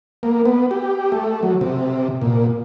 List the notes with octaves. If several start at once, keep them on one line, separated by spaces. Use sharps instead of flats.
A#3
B3
G4
A3
F#3
C3
A#2